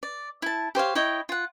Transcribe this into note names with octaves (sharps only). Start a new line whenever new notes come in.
D5
E4 A5
G4 C5 C#5 F5
E4 C#5 D#5 G5
F4 F#5